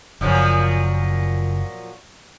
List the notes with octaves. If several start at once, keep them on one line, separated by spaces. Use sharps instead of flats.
F#1 A#2 F3 F#3